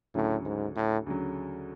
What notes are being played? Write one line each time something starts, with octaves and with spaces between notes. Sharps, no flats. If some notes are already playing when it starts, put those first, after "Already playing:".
D2 A2 C#3 F#3
G#2
A2
D2 C#3 F#3